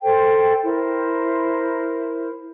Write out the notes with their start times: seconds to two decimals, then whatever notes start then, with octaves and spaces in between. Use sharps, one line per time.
0.03 A4 C5 G5
0.63 E4 A#4 C5